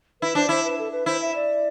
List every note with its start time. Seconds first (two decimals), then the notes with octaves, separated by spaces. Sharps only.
0.21 E4 B4
0.35 D4 C5
0.49 E4 C5
0.64 B4
0.79 A4
0.92 B4
1.06 E4 C5
1.21 E5
1.35 D5